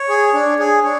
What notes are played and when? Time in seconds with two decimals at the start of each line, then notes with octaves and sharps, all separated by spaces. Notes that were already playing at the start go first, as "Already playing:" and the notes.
Already playing: C#5
0.09 G#4
0.34 D4
0.59 G#4
0.84 D4 C#5